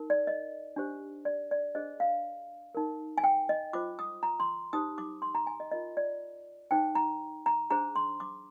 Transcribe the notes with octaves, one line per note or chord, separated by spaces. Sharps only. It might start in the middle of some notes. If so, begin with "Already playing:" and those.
Already playing: D#4 A#4
D5
D#5
D4 G4 C5
D5
D5
D4 G#4 C5 D#5
F5
D#4 A#4
G#5
G5
D#5
F4 C5 D6
D#6
A#5
C6
D#4 G4 C5 D#6
D6
C6
A#5
G#5
D#5
F4 A#4 D#5
D5
D#4 G#4 C5 G5
A#5
A#5
D4 G#4 C5 A#5
C6
D6